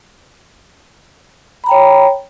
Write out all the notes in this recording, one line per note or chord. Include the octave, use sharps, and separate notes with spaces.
C#5 G5 A#5 B5